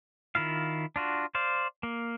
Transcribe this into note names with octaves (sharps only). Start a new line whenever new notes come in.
D#3 E4 F4 F5
D4 F4 F#4
C5 D5 F5
A#3